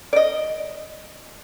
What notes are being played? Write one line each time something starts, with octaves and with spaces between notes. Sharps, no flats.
D5 D#5